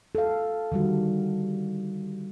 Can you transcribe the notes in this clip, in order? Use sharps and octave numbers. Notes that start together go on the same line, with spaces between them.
A4 F5
D3 D#3 G3 F#4